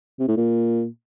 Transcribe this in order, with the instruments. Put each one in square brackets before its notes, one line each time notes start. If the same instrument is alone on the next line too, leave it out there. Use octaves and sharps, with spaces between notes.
[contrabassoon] C3
A2
A#2